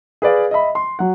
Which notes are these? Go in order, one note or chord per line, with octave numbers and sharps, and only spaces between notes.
G#4 B4 D5 F5
D#5 E5 B5
C6
F#3 F#5